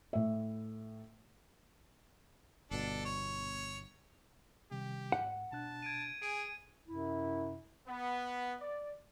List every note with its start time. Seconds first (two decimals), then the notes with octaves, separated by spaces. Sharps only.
0.13 A2 E5
2.71 G1 B2 D4 A4
3.05 C#5
4.71 C3 D#3 G3 G4
5.12 G#2 F#5
5.52 B2 D4 A5 F#6
5.82 G#6 D7 D#7
6.22 G#4 G#5 D7 D#7
6.86 F#2 C3 E4
7.88 B3
8.60 D5